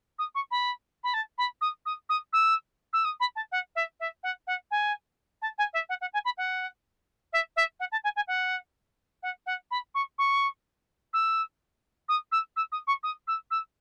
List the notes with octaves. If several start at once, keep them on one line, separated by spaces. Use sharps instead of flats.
D#6
C#6
B5
B5
A5
B5
D#6
D#6
D#6
E6
E6
D#6
B5
A5
F#5
E5
E5
F#5
F#5
G#5
A5
G#5
E5
F#5
F#5
G#5
B5
F#5
E5
E5
F#5
A5
G#5
G#5
F#5
F#5
F#5
B5
C#6
C#6
E6
D#6
E6
E6
D#6
C#6
D#6
E6
E6